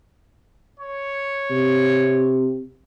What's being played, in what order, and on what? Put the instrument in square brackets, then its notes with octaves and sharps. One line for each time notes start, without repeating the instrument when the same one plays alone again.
[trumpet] C#5
[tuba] C3